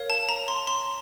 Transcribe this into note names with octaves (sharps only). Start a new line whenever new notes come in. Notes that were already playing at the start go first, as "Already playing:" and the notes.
Already playing: A#4 C#5 F5
A5
A#5
C6
C6